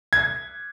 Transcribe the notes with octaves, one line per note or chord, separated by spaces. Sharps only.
G#6